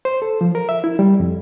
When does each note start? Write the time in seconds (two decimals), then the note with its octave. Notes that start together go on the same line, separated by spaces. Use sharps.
0.05 C5
0.22 A4
0.41 F3
0.55 A#4
0.69 E5
0.84 E4
0.99 G3
1.20 F2